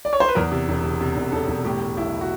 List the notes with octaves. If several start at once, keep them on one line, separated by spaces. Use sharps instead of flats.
D5
C#5
C5
B4
E2 A#4
C3
E1
C3
C3
E1
E1 A4
E1
A2 G4
A2
B1 E4
F#4